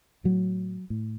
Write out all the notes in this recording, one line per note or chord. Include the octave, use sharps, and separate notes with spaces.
A2 F#3
A2